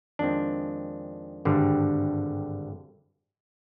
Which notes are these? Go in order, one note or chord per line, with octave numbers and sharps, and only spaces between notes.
F2 D#3 G#3 C4 D4
G#1 G2 D3 G3